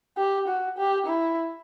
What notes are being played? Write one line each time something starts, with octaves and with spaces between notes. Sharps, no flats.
G4
F#4
G4
E4